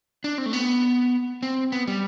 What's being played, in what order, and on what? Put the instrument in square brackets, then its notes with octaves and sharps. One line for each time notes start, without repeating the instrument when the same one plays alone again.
[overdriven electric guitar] D4
C4
A3
B3
C4
B3
G3